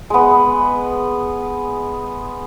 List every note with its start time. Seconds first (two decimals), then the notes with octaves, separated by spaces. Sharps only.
0.10 G#3 B3